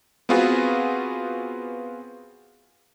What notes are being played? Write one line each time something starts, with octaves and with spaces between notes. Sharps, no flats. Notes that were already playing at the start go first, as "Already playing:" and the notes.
B3 C4 F4 F#4 G#4 B4